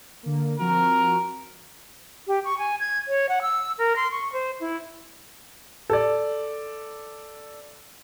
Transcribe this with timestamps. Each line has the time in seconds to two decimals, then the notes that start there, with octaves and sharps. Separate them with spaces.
0.23 D3 A#3
0.59 F3 C4 F#4 A#4
2.27 G4
2.45 C#6
2.59 G#5
2.80 G#6
3.08 C#5
3.29 F#5
3.42 E6
3.79 A#4
3.96 C6
4.11 C#6
4.33 C5
4.60 E4
5.90 A4 D5